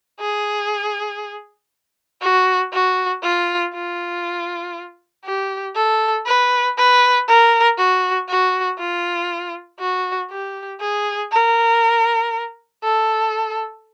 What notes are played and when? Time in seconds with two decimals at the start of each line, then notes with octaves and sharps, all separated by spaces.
0.20 G#4
2.22 F#4
2.73 F#4
3.23 F4
3.74 F4
5.25 G4
5.76 A4
6.26 B4
6.77 B4
7.28 A#4
7.78 F#4
8.29 F#4
8.79 F4
9.80 F#4
10.31 G4
10.81 G#4
11.31 A#4
12.83 A4